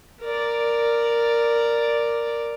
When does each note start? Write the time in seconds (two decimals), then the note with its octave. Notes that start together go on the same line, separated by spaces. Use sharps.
0.22 A#4 D5